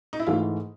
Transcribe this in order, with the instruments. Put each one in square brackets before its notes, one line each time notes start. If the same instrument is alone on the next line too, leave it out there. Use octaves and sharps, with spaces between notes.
[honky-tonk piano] D#4
E4
[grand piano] G#2 E3 A3 [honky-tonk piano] F4